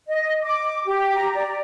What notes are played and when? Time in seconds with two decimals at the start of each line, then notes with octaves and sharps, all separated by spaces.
0.08 D#5
0.43 D6
0.86 G4
1.15 A#5
1.34 D5